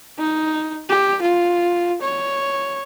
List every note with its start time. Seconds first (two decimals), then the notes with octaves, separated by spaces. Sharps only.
0.19 D#4
0.89 G4
1.22 F4
2.02 C#5